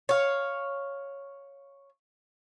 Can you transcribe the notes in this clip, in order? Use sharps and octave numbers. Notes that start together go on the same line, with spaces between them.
C#5 F5